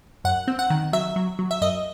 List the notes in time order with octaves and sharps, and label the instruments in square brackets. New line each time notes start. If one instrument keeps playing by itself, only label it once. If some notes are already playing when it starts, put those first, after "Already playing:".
[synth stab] F#2 F#5
C4
F#5
D#3
F#3 E5
F#3
F#3
E5
F#2 D#5